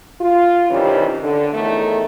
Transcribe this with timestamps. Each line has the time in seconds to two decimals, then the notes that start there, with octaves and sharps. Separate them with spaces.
0.21 F4
0.71 G2 C3 D#3 E3 G3 C#4
1.23 D3
1.53 E2 A2 D#3 A3